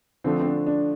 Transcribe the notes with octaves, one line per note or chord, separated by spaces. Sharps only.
D3 F3 A3 C4
C4
D4
D4